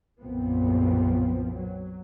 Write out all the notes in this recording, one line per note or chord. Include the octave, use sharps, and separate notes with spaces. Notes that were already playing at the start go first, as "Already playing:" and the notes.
B1 F#2 A#2 F3 B3 C4
F#3